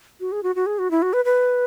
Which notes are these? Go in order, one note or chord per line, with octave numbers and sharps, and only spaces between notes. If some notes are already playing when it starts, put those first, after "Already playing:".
F#4
G#4
F#4
F#4
G#4
F#4
E4
F#4
B4
B4